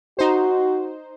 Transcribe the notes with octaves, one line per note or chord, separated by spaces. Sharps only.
D#4 F#4 C5